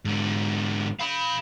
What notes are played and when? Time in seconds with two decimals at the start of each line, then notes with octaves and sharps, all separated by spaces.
0.05 G#2 D3
0.99 F5 B5